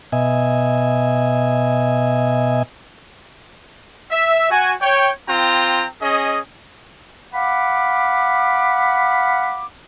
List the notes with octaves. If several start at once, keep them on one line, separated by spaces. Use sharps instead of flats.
B2 D#5 E5 G#5
E5
F#4 G#5
C#5 G5
C4 F4 G5 A#5
C#4 G#4 D#5
F5 F#5 B5 D6